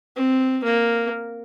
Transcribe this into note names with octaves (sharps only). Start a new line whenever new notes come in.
C4
A#3